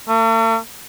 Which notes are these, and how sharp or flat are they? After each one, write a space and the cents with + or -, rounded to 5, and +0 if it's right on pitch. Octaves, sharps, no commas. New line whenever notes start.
A3 +45